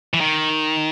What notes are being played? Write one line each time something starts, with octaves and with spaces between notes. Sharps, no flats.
E3
D#3